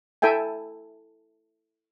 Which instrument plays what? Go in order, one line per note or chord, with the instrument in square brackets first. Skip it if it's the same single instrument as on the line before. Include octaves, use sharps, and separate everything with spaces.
[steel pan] E4 A4 E5 G5 G#5